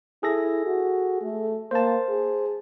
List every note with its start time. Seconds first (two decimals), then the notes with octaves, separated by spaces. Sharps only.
0.23 E4 G#4 A4 A#6
0.66 F#4
1.22 A3
1.71 A#3 C5 A5
2.09 G#4